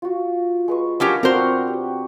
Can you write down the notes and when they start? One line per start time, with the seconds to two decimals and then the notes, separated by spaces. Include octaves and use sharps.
0.02 F4 F#4
0.68 G#3 B4 C#6
1.00 F3 F#3 C#4 G4 A#4 B5
1.23 B3 C4 D4 F#4 A#4 C5 D6
1.67 G4